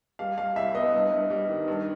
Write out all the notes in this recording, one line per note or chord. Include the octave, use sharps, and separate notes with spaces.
G3 F5
G3 F5
C2 E5
B3 D#5
G2
G2
G3
D#3
G2